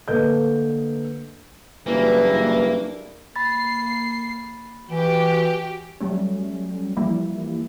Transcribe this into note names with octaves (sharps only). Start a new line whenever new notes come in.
D3 A3 A#3 B4 D#5 G6
F#1 G2 E3 A#3
A#3 B5 A6 C7
E3 F#4 G4 G5
F#3 G3 A3 C#4
E3 F3 G3 A#3 E4